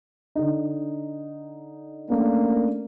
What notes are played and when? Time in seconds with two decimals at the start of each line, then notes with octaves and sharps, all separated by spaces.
0.35 D3 D#4
2.10 A3 A#3 C#4 D4